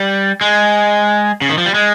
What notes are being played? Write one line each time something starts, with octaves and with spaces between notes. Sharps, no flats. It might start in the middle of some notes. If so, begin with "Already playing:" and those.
Already playing: G3
G#3
C#3
D#3
F3
G3
G#3